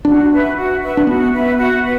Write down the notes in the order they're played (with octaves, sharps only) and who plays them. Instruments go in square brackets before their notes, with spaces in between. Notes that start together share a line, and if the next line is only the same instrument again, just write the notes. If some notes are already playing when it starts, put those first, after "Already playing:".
[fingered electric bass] D4 [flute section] F#4
[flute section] B4 E5
F#4
B4 E5
[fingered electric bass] D4
[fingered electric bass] B3 [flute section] F#4
[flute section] B4 E5
F#4
B4